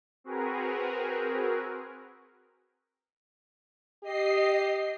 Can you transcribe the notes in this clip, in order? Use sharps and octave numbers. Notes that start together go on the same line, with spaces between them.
C4 F#4 G#4 A#4 B4
G4 D#5 C7